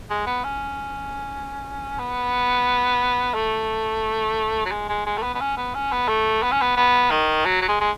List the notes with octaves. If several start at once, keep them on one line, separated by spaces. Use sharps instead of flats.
G#3
B3
C#4
B3
A3
F#3
G#3
G#3
G#3
A3
B3
B3
C#4
B3
C#4
B3
A3
B3
C#4
B3
B3
D#3
F#3
F#3
G#3
G#3